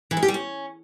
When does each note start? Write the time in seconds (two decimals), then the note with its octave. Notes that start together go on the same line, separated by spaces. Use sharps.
0.11 E3
0.17 G#3
0.23 G4
0.28 G3
0.34 C#4